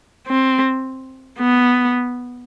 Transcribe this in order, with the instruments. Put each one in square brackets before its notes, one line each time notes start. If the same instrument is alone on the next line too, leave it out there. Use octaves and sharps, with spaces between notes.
[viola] C4
B3